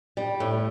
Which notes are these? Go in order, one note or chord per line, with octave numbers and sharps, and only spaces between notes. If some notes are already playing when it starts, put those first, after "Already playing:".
G3
A2